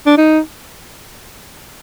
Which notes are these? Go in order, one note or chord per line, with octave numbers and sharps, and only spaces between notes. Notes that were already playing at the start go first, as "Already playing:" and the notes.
D4
D#4